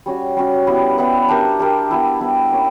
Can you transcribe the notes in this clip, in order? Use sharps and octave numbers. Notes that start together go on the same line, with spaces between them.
G3 C#4 F#4
G3 C#4 F#4
G3 B3 E4 B4
G3 B3 E4 B4
D4 G4 A#4 E5
D4 G4 A#4 E5
G3 B3 E4 G4
G3 B3 E4 G4
G3 A#3 C#4 G4